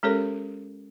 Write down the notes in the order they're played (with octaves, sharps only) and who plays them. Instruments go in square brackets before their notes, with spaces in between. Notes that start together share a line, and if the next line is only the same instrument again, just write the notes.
[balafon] G#3 C#4 G4 A4 A#4 C#5